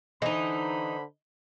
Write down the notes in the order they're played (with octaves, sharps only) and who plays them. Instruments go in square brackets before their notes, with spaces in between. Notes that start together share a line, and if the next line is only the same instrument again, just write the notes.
[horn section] D3 C5 B5 [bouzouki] E3 D#4 [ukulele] D#5